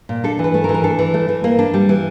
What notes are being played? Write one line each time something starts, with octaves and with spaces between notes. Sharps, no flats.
A#2
D4 A4
E3
B4
A3
A#4
E3
A#4
D4 A4
E3
A3
E3
A#3
D4
G3
E3